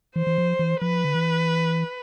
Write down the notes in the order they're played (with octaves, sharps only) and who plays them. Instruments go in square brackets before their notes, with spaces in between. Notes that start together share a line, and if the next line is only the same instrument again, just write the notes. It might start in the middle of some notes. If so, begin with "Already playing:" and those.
[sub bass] E3 [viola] C5
[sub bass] E3
F3
E3
[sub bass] F3 [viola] B4
[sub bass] D3
E3